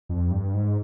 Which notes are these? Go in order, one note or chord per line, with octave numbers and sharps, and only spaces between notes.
F2
G2
G#2